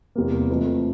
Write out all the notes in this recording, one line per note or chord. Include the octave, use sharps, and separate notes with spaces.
E2 C3 G3 A#3
F2 E3 A3 C4